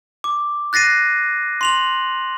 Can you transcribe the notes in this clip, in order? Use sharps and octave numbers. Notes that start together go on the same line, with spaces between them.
D6
F#6 A6 A#6 C7 D#7
C6 F7 F#7